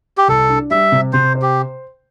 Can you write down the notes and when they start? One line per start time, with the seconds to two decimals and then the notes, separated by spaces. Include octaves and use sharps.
0.18 G4
0.28 C2 A4
0.49 D4
0.71 G3 E5
0.92 C3
1.13 C3 C5
1.35 C5
1.42 G4